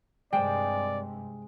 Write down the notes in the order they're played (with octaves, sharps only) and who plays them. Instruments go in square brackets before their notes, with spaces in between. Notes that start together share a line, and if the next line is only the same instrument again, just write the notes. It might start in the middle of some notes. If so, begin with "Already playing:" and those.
[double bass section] G2 C3 [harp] G#3 [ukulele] C5 G5 [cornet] D5